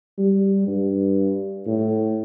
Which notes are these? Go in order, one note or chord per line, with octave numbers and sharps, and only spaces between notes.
G3
G2
A2